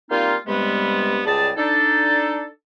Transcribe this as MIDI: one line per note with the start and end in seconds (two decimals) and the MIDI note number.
0.11 0.36 55
0.11 0.36 58
0.11 0.36 60
0.11 0.36 63
0.11 0.36 65
0.47 1.21 43
0.47 1.21 48
0.47 1.21 55
0.47 1.21 56
0.47 1.21 59
1.26 1.51 37
1.26 1.51 55
1.26 1.51 68
1.26 1.51 74
1.26 1.51 81
1.57 2.47 62
1.57 2.47 63
1.57 2.47 69